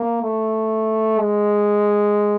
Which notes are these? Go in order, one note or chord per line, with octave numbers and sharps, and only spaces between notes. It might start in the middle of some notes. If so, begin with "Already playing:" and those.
Already playing: A#3
A3
G#3